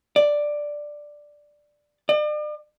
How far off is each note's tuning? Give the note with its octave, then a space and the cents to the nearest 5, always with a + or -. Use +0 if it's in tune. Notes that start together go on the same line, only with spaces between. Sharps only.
D5 +5
D5 +40